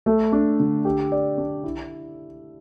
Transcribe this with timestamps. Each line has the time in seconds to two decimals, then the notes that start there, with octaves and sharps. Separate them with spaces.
0.06 A3
0.32 D4
0.60 D3
0.85 G4
1.12 D5
1.38 D4
1.64 E4